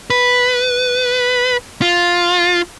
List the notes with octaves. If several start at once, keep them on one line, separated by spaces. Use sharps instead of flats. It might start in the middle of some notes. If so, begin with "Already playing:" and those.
B4
F4